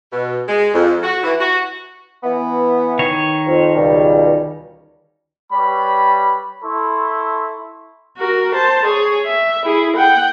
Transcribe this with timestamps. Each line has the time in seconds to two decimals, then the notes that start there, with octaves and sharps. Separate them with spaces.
0.12 B2
0.48 G#3
0.74 F2
1.03 F#4
1.23 E3
1.40 F#4
2.23 E3 B3
2.99 D#3 C#5
3.46 F2
3.75 C#2 B2 G3
5.53 G3 B4 C#5 B5
6.63 E4 A4 C6 C#6
8.18 F#4 A#4
8.55 C5 A5
8.86 G#4 C#5
9.26 E5
9.66 E4 G#4
9.97 F#5 G5